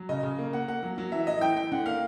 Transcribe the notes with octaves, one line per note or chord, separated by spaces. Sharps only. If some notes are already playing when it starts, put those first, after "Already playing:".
Already playing: F#3
C#3 D#5
C#3
A#3
A#3 F#5
A#3 F#5
F#3
F#3
E3 E5
A2 D#5
E3 G5
E3 G5
D3 F#5
A#3 F5